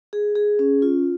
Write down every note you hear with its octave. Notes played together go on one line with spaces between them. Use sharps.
G#4
G#4
C#4
F4